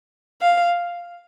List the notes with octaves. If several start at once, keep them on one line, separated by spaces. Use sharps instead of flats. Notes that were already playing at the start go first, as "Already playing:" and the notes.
F5